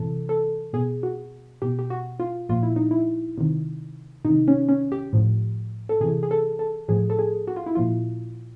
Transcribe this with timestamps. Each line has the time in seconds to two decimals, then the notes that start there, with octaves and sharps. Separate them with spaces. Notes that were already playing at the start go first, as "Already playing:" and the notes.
Already playing: C3 E3 A4
0.29 A4
0.73 B2 G#4
1.03 F#4
1.62 B2 G4
1.79 G4
1.90 F#4
2.20 F4
2.49 A#2 F3 F4
2.63 E4
2.76 D#4
2.91 E4
3.38 C3 D#3
4.25 C3 D#3 D#4
4.48 C#4
4.69 C#4
4.92 G4
5.13 A2 F3
5.89 A4
6.01 C3 E3 G#4
6.23 G#4
6.31 A4
6.59 A4
6.88 A2 F3 G#4
7.10 A4
7.19 G#4
7.48 F#4
7.56 F4
7.66 E4
7.75 A#2 F3 F4